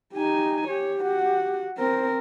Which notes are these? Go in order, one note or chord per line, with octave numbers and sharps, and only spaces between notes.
D#4 G4 G#5
G4 C#5
F#4 F#5
C4 A#4 C5